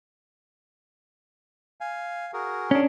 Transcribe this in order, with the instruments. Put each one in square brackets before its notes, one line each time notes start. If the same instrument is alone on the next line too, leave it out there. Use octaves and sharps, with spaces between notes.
[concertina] F5 G#5
F#4 G#4 A#4
[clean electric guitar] C#4 D4